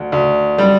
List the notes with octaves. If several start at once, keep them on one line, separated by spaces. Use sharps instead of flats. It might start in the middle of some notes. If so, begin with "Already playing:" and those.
Already playing: D2
D2
G3